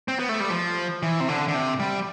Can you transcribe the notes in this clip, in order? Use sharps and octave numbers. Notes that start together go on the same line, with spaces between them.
C4
B3
A3
G3
F3
E3
C3
D3
D3
C3
G3